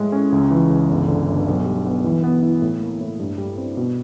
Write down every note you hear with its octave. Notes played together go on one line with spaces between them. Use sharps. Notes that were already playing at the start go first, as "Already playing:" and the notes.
Already playing: A2 G#3
C#4
C#2
E3
C#2
G1
D3
G1
B1
G3
B3
E3
B3
E4
A2
A#3
A2
G2
G3
C4
B2